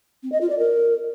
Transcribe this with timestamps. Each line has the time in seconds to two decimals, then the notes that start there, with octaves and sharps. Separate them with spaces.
0.23 C4
0.32 D#5
0.41 F4
0.50 D5
0.59 A#4